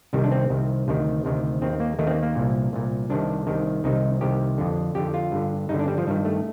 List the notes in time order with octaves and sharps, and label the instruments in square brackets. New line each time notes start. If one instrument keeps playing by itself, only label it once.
[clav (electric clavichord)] C2 C3 D#3 G3
D4
C4
C2 C3 D#3
D2 C3 D#3
D2 C3 D#3
D#2 D#3 C4
A#3
D#2 D#3 A3
C4
A#3
A#3
C2 A#2
C2 A#2
C2 C3 D#3 D4
C2 C3 D#3
C2 C3 D#3 D#4
C2 C3 D#3 G4
F2 D3
F2 D3 G4
F4
G2 D3
G2 D3 D#4
D4
G3
F3
G2 D#3 G3
A3